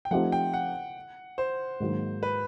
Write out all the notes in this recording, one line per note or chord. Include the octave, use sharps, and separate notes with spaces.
G5
F3 A3 C4 D#4 G4 F#5
G5
F#5
C5
G#2 D#3 F#3 A#3
B4